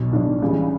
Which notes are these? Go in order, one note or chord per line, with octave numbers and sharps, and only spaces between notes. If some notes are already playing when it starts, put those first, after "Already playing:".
Already playing: B1 B2
B1 B2 D4
C#2 C#3 E3 G3